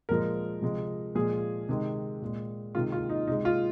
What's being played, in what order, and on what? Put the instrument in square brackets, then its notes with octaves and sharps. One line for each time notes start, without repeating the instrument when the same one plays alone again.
[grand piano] A#2 F3 G#3 A#4
C3 F3 G#3
A#2 F3 G#3 G#4
C3 D#3 G#3
A#2 G#3
C3 D#3 G#3 F4
F4
D#4
C3 G#3 D#4
F4